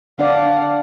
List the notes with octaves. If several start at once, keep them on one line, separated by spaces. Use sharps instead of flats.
D3 D4 D5 F5 F#5